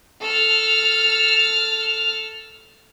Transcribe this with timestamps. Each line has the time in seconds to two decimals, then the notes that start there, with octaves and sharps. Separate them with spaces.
0.22 A4 F6